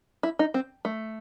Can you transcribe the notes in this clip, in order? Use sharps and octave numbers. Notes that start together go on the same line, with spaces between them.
E4
D#4
C4
A3